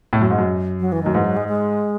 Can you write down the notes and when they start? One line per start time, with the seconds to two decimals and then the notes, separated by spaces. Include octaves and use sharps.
0.13 A2
0.21 F#2
0.30 G#2
0.38 F#2
0.80 F#3
0.92 E3
1.03 F#2 D#3
1.14 G#2 E3
1.26 F#3
1.37 G#3
1.48 G#3